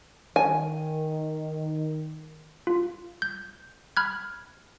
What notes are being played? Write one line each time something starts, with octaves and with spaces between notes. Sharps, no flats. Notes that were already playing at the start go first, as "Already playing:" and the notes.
D#3 G#5
F4
G6
B5 F6 F#6 G#6